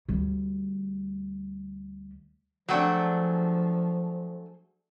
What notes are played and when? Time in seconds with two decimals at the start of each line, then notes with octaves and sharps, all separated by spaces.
0.09 D2 G3
2.69 F3 F#3 A3 D4 G#4 F#5 G5